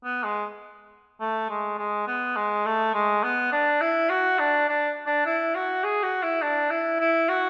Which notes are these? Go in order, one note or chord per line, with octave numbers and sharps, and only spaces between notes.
B3
G#3
A3
G#3
G#3
B3
G#3
A3
G#3
B3
D4
E4
F#4
D4
D4
D4
E4
F#4
G#4
F#4
E4
D4
E4
E4
F#4